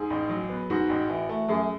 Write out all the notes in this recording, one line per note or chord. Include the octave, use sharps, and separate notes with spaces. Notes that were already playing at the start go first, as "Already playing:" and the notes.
Already playing: G#2 G#4
A1
F#3
B3
G#2 F#4
A1
E3
A3
F#2 G#4